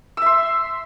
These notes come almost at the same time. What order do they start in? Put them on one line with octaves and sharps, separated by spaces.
E6 E5 C6